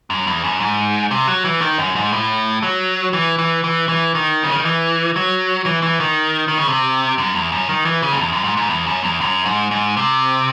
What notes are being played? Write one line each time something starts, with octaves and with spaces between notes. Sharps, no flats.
F#2
E2
F#2
G#2
C3
F#3
E3
D#3
F#2
G#2
A2
F#3
E3
E3
E3
E3
D#3
C#3
D#3
E3
F#3
E3
E3
D#3
D#3
C#3
C3
F#2
E2
F#2
D#3
E3
C#3
F#2
E2
F#2
G#2
G#2
E2
F#2
E2
F#2
G#2
G#2
C3